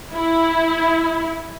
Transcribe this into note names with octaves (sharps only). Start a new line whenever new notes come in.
E4